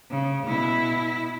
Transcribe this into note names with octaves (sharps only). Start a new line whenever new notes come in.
C#3
B2 E4